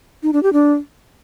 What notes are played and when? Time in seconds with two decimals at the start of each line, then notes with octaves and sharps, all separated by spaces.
0.23 D#4
0.33 D4
0.43 G4
0.53 D4